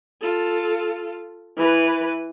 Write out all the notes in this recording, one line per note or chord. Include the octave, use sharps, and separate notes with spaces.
F4 A4
E3 B4